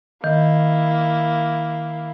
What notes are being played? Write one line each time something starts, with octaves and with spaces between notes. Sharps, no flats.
D#3 A#3 E4